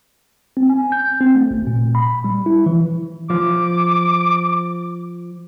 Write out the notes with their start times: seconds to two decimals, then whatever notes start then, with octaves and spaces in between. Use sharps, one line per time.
0.57 C4
0.69 G#5
0.92 G6
1.20 C4
1.35 A3
1.51 G#1
1.67 A#2
1.95 B5
2.24 G3
2.46 E4
2.66 E3
3.30 F3 D6